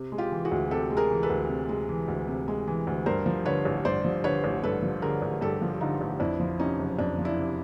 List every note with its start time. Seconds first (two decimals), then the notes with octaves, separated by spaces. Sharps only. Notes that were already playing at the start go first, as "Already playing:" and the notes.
Already playing: C3
0.12 G#3
0.18 F4 G4
0.32 E3
0.45 F#4 G#4
0.51 D2
0.70 C3 G4 A4
0.91 G#3
0.97 G#4 A#4
1.11 E3
1.23 A4 B4
1.30 D2
1.49 C3
1.69 G#3
1.89 E3
2.08 D2
2.28 C3
2.48 G#3
2.67 E3
2.87 D2
3.06 G2 A#4 C5
3.26 F3
3.45 D3 B4 C#5
3.65 A1
3.85 G2 C5 D5
4.05 F3
4.24 D3 B4 C#5
4.44 A1
4.64 G2 A4 B4
4.82 F3
5.02 D3 G#4 A#4
5.22 A1
5.41 G2 G4 A4
5.62 F3
5.81 D3 D#4 F4
6.01 A1
6.20 F2 D4 E4
6.40 F3
6.60 C3 C#4 D#4
6.79 F#1
6.99 F2 D4
7.18 F3
7.25 D4 E4
7.38 C3